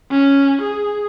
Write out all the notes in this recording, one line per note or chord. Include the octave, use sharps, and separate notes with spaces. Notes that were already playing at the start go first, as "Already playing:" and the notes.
C#4
G#4